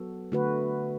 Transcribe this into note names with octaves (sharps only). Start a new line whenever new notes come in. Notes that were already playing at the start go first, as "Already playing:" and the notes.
Already playing: F#3 B3 F#4 A4
D3 A3 F#4 B4